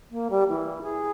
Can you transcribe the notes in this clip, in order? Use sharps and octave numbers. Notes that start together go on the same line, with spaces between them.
A#3
G3
E3
G#4